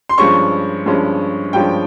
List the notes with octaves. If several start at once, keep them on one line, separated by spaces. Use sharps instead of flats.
C6
G2 F3 G#3 C#4 C#6
G2 F3 G#3 C#4
G2 F3 G#3 C#4 G5